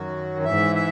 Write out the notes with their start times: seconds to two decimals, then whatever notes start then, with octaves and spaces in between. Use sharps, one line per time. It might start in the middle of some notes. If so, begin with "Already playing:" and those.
Already playing: F#2 D#3 F#3 F#4
0.44 G#2 E3 E5
0.75 E5